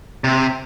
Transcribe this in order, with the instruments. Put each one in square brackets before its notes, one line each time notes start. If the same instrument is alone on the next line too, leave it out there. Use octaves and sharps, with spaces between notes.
[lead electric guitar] C3